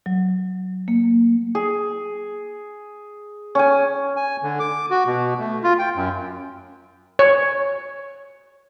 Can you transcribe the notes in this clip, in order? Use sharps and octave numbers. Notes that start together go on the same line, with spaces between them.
F#3
A#3
G#4
C#4 G#5
G#5
D3
D6
F#4
B2
A3
F4
G5
F#2
C#5